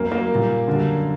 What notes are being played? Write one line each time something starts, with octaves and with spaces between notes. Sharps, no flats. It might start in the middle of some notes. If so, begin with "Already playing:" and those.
Already playing: F#2 F#3 A#3
A#3
A#2 G3
F#2 D3 G3